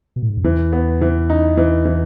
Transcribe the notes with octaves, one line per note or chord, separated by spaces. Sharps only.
B2
A2
G#2
F#2
E2 E3
B3
E3
D#4
E3
E3